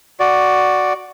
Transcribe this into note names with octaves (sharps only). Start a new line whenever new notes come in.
F#4 D5